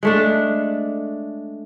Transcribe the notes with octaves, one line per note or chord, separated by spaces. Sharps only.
G#3 A3 D4